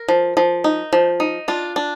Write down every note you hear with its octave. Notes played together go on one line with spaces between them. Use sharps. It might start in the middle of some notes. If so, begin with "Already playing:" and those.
Already playing: A#4
F3
F3
D#4
F3
D#4
D4 F4
D4